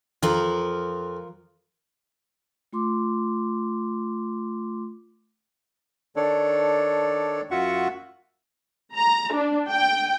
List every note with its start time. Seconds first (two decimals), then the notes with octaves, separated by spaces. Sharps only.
0.23 F2 F3 A#4
2.73 A3 F4 C6 D6
6.16 D#3 D4 A4 C#5 D5
7.51 F#2 F4 F#4 E5 F#5 C#6
8.96 A#5
9.33 D4
9.70 G5